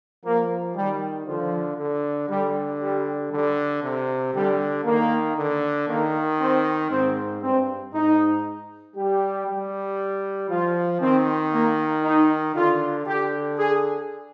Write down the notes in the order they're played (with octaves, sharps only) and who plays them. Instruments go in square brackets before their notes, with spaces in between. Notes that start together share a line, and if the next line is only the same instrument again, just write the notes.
[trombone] F3 [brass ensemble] A#3
[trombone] D#3 [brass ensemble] G3
[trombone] D3 [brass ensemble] F3
[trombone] D3
[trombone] D3 [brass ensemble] G3
[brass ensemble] G3
[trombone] D3 [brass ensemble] G3
[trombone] C3
[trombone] D3 [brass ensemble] G3
[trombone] D#3 [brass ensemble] A#3
[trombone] D3
[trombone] D#3 [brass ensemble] A#3
[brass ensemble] C4
[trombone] G#2 [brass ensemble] C4
[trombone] G2 [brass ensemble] C4
[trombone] G#2 [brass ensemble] D#4
[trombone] G3 [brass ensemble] G4
[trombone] G3
[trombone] F3 [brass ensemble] F4
[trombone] D#3 [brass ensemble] C4
[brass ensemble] A#3
D#4
[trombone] D3 [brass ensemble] F4
[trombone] D3 [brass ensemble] G4
[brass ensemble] G#4